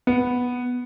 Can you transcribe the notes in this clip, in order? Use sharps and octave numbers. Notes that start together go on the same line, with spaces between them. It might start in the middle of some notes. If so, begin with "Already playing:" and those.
B3